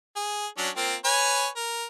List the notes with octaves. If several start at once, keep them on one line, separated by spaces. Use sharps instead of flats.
G#4
F#3 C#4 D4
A#3 C4 F4
B4 C#5 G#5
A#4